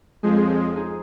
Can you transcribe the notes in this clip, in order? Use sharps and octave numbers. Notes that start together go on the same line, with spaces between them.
F2 F3 G#3 G#4 C5
G#4 C5
G#4 C5
D#4 G#4